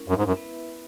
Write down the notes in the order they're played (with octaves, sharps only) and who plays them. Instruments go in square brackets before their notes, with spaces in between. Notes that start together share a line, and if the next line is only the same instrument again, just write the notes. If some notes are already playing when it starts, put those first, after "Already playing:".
Already playing: [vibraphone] G#3 C#4 E4 A#4
[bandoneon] F#2
G#2
F#2
[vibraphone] B3 E4 B4 E5